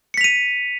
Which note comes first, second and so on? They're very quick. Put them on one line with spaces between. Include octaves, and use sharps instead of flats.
C#7 B6 F7 D#7